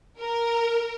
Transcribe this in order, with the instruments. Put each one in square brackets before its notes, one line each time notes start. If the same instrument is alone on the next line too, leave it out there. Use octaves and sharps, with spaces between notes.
[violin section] A#4